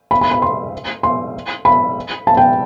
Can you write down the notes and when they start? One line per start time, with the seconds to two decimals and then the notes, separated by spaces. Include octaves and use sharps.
0.11 B5
0.21 B5
0.31 B5
0.42 C6
1.03 C6
1.65 B5
2.27 A5
2.37 G5